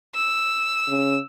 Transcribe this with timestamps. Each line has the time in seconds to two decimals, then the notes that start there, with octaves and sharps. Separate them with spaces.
0.15 E6
0.88 C#3